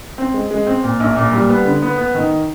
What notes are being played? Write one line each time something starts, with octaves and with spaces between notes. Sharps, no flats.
C4
G#3
G#3
C4
A#2
A#1
A#2
G3
B3
D3
B3
B3
D#3